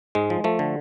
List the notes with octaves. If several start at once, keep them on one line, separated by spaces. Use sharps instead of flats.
G#2 G#3
F3
F3 A3
D3